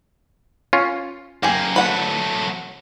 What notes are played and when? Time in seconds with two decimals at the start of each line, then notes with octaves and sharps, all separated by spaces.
0.73 C#4 F4
1.43 F#2 A#3 G4 G#4
1.76 F#3 A3 B4 F#5